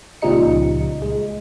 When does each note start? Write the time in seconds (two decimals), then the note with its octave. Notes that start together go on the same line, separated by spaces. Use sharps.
0.22 C#2 A#2 F3 G3 D#4 C#7
1.02 G#3